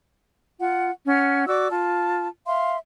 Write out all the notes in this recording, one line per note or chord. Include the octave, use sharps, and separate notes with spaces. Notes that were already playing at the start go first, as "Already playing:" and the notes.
F4 F#5
C#4 F#5 F6
F#4 D5 D6 E6
F4 A5
E5 F5 C6